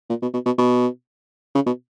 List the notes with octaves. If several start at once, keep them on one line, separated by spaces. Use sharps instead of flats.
A#2
B2
B2
B2
B2
C#3
B2